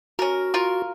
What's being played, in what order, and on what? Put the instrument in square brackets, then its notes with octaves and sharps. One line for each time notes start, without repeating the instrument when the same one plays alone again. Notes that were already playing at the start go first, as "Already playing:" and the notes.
[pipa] C#4 A#4 [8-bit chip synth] F#4
[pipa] F4 A#4